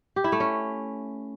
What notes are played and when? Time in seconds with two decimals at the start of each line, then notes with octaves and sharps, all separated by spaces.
0.16 G4
0.24 E4
0.32 A3
0.40 C#4